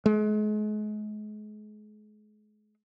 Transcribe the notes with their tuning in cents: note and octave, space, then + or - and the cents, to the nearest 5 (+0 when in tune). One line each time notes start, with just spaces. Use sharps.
G#3 +35